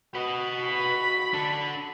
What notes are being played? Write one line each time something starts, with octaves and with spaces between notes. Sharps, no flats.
F#4 B4 D#5
B5
D4 A4